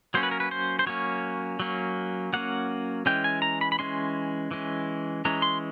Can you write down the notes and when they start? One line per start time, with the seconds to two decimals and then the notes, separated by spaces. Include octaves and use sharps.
0.14 F#3 A#3 C#4 C5
0.23 B4
0.31 A#4
0.40 B4
0.51 C5
0.79 C5
0.87 F#3 A#3 C#4 C#5
1.60 F#3 A#3 C#4
2.33 F#3 A#3 C#4 F#5
3.06 E3 G#3 C#4 G5
3.24 G#5
3.42 A#5
3.61 B5
3.72 B5
3.79 E3 G#3 C#4 C6
4.51 E3 G#3 C#4
5.25 E3 G#3 C#4 A#5
5.42 C6